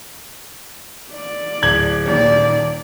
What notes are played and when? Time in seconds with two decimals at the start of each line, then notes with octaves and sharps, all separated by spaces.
1.12 D5
1.62 D1 G#6 F#7
2.07 D#1 D#2 D5